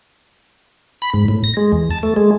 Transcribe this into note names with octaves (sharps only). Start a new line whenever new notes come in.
B5
G#2
A2
A#6
G#3
E2
A5
A3
G#3